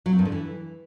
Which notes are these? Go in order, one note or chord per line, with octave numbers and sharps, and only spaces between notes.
F#3
C4
G2
D3
E3